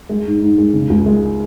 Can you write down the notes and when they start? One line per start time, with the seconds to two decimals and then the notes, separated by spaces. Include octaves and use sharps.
0.09 G#3
0.26 G#2
0.42 G#2
0.58 G#3
0.73 C#3
0.89 C#2
1.06 G#3